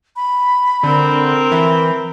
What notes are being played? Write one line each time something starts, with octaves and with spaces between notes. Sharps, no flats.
B5
D3 C4 A#4
E3 B5